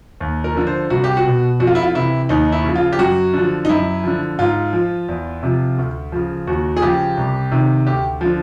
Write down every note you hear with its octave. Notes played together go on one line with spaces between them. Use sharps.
D#2
A#4
D3 F3
C5
C2 F#4
G4
F#4
B2
F2 F#4
F4
E4
F4
C3 E3 E4
D#2 D#4
E4
C#3 F3
F4
G4
F#2 F#4
D3 F3
D#4
F#2 E4
D3 F3
G#2 F4
F3
E2
C3 F3
D2
C#3 F3
D#2 F#4
G#4
C#3 F3 G4
C2
C3 D#3
D2 G4
D3 F3